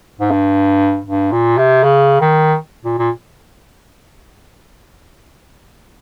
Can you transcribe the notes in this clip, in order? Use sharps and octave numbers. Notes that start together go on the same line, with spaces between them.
G#2
G2
G2
A#2
C3
C#3
D#3
A#2
A#2